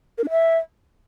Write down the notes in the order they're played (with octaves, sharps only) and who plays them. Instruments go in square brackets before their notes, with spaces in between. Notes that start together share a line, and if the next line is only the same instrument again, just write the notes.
[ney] A#4
D4
E5